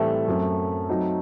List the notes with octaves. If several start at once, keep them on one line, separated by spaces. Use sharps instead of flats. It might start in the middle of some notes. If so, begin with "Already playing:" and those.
Already playing: A2 E3 G3 A3 C4
F#2 F#3 C4
F#3 C4 D#4